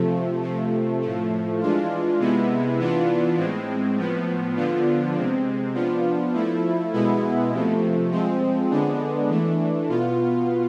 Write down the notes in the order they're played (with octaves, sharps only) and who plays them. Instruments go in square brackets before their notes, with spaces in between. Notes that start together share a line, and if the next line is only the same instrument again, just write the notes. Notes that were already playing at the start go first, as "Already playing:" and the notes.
Already playing: [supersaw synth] C3 F3 A3
C3 F3 A3
A2 F3 A3
E3 G#3 D4 F4
C3 G#3 B3 E4
E3 B3 D4 F4
A2 G#3 C4
A2 F3 B3
D3 F3 B3 D4 F4
C3 G#3 C4
F3 B3 D4 F4
F3 A3 E4
B2 G#3 B3 E4
C3 F3 A3
F3 G#3 C4
D3 G#3 B3 D4
E3 A3 D4
B2 B3 F4